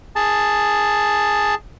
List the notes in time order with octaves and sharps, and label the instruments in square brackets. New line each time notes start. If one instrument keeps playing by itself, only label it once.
[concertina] G#4 A5